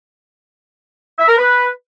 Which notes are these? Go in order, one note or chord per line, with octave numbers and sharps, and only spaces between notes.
E5
A#4
B4